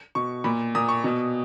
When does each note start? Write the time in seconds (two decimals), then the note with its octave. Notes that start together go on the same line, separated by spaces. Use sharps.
0.15 B2 C#6
0.44 A#2 B5
0.75 A#2 D#6
0.89 C#6
1.04 B2